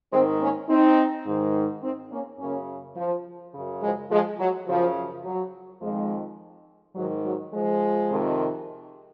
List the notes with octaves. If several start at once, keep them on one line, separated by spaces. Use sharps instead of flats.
G#2 D#3 G#3 C4
A#3 C#4
C4 D#4
G#2 D#3
C4 D#4
A#3 C#4
F#2 C#3 A#3 C#4
F3
F#2 C#3
F3 G#3
F3 G#3
F#3
F#2 C#3 F3
F#3
F2 D#3 F3 G#3
G#2 D#3 F#3
F#3
F3 G#3
F2 C3 D#3